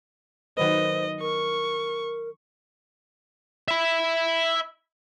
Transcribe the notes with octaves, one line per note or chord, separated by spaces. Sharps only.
D#3 F#3 B4 C5 D#5
A#4 C#6
E5 B5